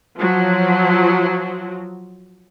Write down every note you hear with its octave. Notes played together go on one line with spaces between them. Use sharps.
F3 F#3